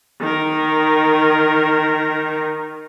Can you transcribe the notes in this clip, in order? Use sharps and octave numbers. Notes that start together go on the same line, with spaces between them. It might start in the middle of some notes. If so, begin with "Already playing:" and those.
D#3 A#4